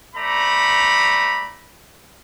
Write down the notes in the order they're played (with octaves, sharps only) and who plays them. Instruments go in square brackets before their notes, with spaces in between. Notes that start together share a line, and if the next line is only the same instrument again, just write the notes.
[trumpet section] A3 C5 D5 A#5 B5